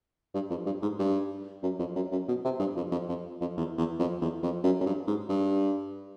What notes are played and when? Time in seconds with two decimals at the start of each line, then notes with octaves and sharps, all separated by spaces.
0.34 G2
0.50 F2
0.66 G2
0.82 G#2
0.99 G2
1.63 F#2
1.79 F2
1.96 F#2
2.12 F#2
2.28 B2
2.44 C3
2.59 G2
2.76 F2
2.92 F2
3.09 F2
3.41 F2
3.57 E2
3.78 E2
3.99 F2
4.22 E2
4.43 F2
4.64 F#2
4.81 F#2
4.86 G2
5.07 G#2
5.29 G2